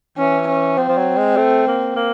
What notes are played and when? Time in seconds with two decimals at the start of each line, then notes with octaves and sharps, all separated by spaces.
0.18 E3 C#4
0.48 C#4
0.77 F3 C4
0.88 F3
0.98 F#3
1.17 G#3
1.37 A3
1.67 A#3
1.96 A#3